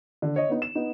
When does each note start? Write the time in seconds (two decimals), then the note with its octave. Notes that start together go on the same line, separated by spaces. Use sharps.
0.22 D3
0.36 C#5 D#5
0.49 B3 D#4
0.62 E7
0.75 B3 D#4